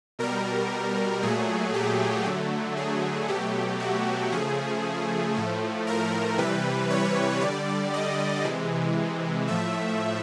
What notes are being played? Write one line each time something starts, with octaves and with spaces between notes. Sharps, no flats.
B2 G3 A#4
A#2 F#3 A3 G#4
G4
D3 F#3 A3
G#4
B2 F#3 A3 G4
F#4
C#3 F3 A3 G#4
A2 F3 A3
A#4
C3 E3 G3 B4
C#5
D3 G3 D5
D#5
C3 E3 G#3
A2 F3 A3 E5